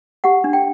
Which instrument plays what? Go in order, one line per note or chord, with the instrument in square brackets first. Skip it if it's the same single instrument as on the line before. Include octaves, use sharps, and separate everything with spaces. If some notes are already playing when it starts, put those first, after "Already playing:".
[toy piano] G4 F#5
D4
G5